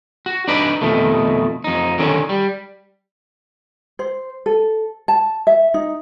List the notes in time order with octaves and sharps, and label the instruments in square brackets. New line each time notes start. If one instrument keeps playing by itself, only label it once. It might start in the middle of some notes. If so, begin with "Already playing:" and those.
[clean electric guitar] F#4
D4 D#4 B4 D5
F2 B2 D#3 A3
F2 D#4
D3 D#3 C#4
G3
[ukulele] C5
A4
A5
E5
D#4